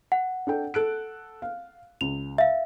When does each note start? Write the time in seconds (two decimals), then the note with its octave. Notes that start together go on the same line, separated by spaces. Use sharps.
0.12 F#5
0.47 D4 A4 G5
0.74 A4 F#6 D7
1.42 F5
2.01 C#2 F7
2.38 E5 F5